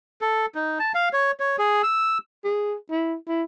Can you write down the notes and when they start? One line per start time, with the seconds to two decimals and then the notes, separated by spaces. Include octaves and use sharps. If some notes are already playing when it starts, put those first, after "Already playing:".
0.21 A4
0.55 D#4
0.79 A5
0.95 F5
1.13 C#5
1.40 C#5
1.58 G#4
1.83 E6
2.44 G#4
2.91 E4
3.28 E4